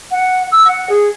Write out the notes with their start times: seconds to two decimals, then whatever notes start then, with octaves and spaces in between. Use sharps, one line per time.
0.10 F#5
0.51 E6
0.65 F#5
0.89 G#4